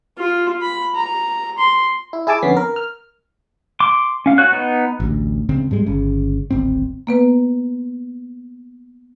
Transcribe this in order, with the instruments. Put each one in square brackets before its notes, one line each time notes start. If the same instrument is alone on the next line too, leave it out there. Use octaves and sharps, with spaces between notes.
[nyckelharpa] F4
B5
A#5
C6
[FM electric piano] E4
E4 G#4 G#5 A5 D6
F2 D3 B3 C#4 B6 C7
A#4
F6
[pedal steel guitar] C6 D6
C#4 F5
F#4 C#5 F#6
B3 D#4
[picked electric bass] A1 D2
C#2 C#3 C4
G#2 G3 G#3
G1 C#3
D1 G#1 C4
[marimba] A#3 B3 B4